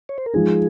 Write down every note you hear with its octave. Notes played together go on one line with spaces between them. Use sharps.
C#5
C5
A#4
F3 G#3 D#4 G#4